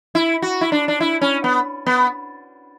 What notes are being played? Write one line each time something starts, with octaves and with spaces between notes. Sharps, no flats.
E4
F#4
E4
D4
D4
E4
C#4
B3
B3